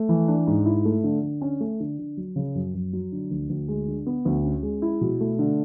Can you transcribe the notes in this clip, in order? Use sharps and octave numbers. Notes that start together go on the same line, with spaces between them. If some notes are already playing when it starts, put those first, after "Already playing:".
Already playing: A3
E3
D4
G#2
E4
A3
D3
D3
C#4
A3
D3
D3
F#3
C#3
F#2
F#2
F#3
D3
D2
D2
G#3
D3
B3
D2
C#4
G#3
E4
B2
A3
D3